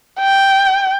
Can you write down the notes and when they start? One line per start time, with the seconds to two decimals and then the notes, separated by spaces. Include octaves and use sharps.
0.21 G5